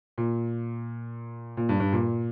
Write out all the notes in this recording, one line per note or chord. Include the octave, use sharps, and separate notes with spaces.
A#2
A#2
G2
G2
A#2